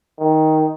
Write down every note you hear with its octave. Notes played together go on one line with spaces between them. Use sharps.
D#3